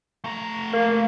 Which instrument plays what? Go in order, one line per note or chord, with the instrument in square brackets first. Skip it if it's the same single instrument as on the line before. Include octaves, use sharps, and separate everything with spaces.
[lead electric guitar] A3 A#5
[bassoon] A#3